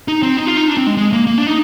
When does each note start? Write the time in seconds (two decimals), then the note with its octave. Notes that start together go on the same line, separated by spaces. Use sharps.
0.08 D#4
0.23 C4
0.37 D#4
0.47 F4
0.57 D#4
0.68 D4
0.77 C4
0.87 G#3
0.97 G#3
1.13 A#3
1.27 A#3
1.38 D4
1.47 D#4